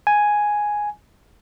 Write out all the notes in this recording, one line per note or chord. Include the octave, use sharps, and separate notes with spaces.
G#5